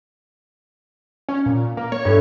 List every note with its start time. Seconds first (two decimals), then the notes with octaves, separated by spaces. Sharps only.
1.29 C#4
1.46 A#2
1.77 A#3
1.92 C#5
2.05 G2 E4